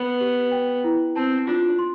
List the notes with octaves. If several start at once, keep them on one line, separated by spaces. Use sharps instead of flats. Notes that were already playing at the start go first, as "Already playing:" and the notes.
Already playing: B3 B5
G4
G5
E4
C4 A5
D4 F4
C6